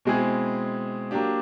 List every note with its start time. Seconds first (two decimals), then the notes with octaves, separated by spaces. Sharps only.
0.05 B2 G#3 C4 E4 G#4
1.11 F#3 A#3 D4 G4